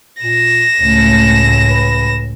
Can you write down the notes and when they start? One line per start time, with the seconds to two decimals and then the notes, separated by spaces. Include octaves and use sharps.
0.22 A#2 A#6 E7
0.81 C#2 A2 A3
1.70 B4